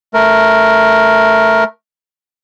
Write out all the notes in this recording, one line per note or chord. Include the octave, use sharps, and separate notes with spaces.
A3 A#4